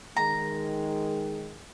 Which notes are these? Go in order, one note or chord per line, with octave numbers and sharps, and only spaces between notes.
D#3 G#3 A#5